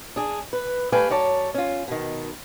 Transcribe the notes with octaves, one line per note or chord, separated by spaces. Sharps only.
D4 G#4
B4
G3 A3 B4 F5 G5 G#5
F#2 C#5 D5 A5
C#4 F4
B2 D#3